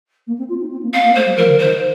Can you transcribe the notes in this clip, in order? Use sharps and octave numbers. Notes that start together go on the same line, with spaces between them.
A#3
C4
F4
D#4
C4
A#3
C4 F5
A#3
A3 C5
G3
F3 A#4
D3
D#3 C5